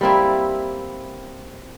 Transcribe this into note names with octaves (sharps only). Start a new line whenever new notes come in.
G3 A#3 C4 E4